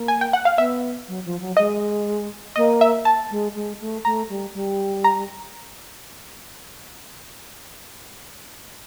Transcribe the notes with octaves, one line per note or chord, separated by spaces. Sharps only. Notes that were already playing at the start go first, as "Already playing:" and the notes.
Already playing: A#3
G#5
G5
F#5
F5
B3 E5
F#3
F3
F#3
G#3 D#5
A#3 D#5
E5
A5
G#3
G#3
A3
A3 A#5
G3
G3
A#5